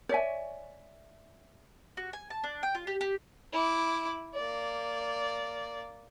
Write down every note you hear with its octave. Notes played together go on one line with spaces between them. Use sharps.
C#5 D5 E5 G#5
F#4
G#5
A5
D4
G5
F4
G4
G4
E4 D6
A#3 D5